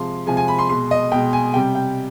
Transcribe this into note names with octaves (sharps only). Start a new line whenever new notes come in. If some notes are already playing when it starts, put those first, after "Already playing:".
Already playing: C3 F3 G#3 C6
C3 F3 G#3 G#5
G#5
B5
C6
B2 G#3 C6
D#5
B2 G#3 G5
G#5
C3 G3 G5
G5